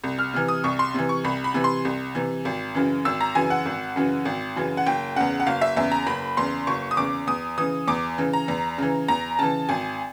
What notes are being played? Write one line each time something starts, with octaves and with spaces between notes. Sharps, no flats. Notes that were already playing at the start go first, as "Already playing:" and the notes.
C2
F6
C3 E3
D#6
C2 C#6
C6
C3 E3
C#6
C2 B5
B5
C3 E3
C6
C2
C3 E3
G#1
F#2 C#3 E3
G#1 E6
A#5
F#2 C#3 E3 G#5
F#5
G#1
F#2 C#3 E3
G#1
F#2 C#3 E3
F#5
F#1 G5
E2 C#3 F#5
F#5
F#1 F5
E5
E2 C#3 E5
A#5
F#1 B5
E2 C#3 C6
F#1 C#6
D#6
E2 C#3 D6
E2 D#6
C#3 E3 D#6
E2 D6
C#3 E3
A#5
E2
C#3 E3
E2 A#5
C#3 E3 A5
G#1 G#5